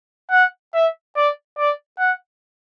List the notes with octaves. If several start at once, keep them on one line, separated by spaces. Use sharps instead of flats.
F#5
E5
D5
D5
F#5